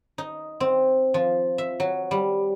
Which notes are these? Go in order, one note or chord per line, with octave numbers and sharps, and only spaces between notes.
D#4
C4
F3
E5
F#3
G3